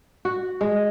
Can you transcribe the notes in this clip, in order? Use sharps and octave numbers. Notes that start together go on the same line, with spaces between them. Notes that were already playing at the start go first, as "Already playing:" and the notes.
F#4
G#3